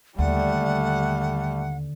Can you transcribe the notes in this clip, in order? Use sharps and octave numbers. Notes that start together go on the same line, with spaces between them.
D#2 D3 G3 A3 F#5